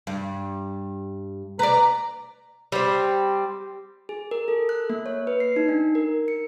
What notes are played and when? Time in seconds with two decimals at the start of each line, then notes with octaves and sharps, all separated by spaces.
0.07 G2
1.59 B4 D5 A#5
2.72 G3 C4
4.09 G#4
4.31 A#4
4.48 A4
4.69 F#6
4.90 A#3
5.06 C#5
5.27 B4
5.40 C7
5.56 D#4
5.69 D4
5.95 A#4
6.28 C#7